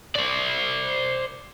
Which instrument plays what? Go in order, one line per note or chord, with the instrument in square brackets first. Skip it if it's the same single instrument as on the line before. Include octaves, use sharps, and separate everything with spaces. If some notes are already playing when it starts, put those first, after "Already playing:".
[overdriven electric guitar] C5 D5